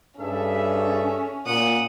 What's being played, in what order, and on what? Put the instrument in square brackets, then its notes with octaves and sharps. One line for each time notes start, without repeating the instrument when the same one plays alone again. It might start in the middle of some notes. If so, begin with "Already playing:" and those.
[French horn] G2 [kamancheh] C#4 [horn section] G#4 A4 E5
[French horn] A#2 [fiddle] F#5 D#6